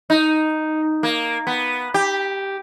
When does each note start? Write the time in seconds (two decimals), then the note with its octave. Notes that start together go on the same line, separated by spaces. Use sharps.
0.10 D#4
1.03 A#3
1.47 B3
1.94 G4